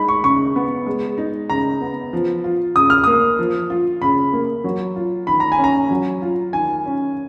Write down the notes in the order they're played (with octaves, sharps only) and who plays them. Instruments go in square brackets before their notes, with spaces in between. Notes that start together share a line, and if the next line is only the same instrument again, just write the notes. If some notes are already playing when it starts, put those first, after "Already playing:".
Already playing: [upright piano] G#3 D#4 [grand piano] B5
[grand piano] C#6
[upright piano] C#3 [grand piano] C#6
[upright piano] B3
G#3
D#4
[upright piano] C#3 [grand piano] A#5
[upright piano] B3
F3
F4
[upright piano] C#3 [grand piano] D#6
[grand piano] F6
[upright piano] A#3 [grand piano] D#6
[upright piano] F3
F4
[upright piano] C#3 [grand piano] B5
[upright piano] A#3
F#3
F4
[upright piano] D#3 [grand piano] B5
[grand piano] A#5
G#5
[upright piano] C#4
[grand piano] A#5
[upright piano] F#3
F4
[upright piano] D#3 [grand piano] G#5
[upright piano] C#4